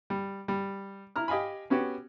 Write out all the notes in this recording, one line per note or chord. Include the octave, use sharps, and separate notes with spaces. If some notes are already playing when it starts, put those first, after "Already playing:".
G3
G3
E4 A#5 F6
G4 D#5 F5 G#5 B5
B3 C#4 F#4 G4